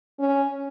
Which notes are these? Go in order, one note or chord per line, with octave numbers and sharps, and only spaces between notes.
C#4